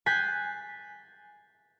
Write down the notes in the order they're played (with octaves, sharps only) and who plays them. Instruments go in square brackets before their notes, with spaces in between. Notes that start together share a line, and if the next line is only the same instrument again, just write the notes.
[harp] G#5 F#6 G6 A6 B6 C7